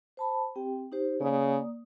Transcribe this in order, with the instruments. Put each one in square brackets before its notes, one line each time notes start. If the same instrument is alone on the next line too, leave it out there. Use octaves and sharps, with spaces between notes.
[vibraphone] C5 A5 B5
C4 G4 G5
D#4 G4 C5
[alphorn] C#3 [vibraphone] A#3 D5 D#6